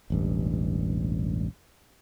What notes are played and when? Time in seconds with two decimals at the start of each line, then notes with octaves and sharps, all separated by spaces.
0.10 E1 A1 G2